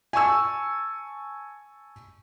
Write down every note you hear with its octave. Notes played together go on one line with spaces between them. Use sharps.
G#5 A5 C#6 E6